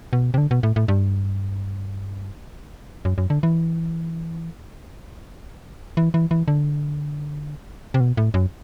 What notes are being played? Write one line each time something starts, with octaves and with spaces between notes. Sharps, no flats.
B2
C3
D3
B2
A2
A2
G2
F#2
F#2
D3
E3
E3
E3
E3
D3
C3
B2
A2
F#2